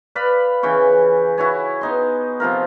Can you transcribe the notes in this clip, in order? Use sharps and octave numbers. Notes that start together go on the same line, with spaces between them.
B4 D5 F5 B5
C#3 E3 G5 C#6
E4 F#4 C#5 G#5
B3 D#4 C6
C3 F3 F4 A#4